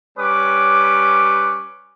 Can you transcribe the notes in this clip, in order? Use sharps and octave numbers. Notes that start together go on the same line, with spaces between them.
G3 C#4 B4 D6